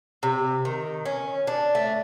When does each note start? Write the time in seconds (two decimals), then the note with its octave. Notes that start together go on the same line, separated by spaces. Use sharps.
0.23 C3
0.65 D#3
1.06 C#4
1.47 D4
1.75 A3